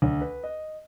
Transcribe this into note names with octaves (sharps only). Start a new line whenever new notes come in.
D2
B4
D#5